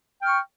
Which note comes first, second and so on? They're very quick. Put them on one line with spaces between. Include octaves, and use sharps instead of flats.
G5 F6 C#6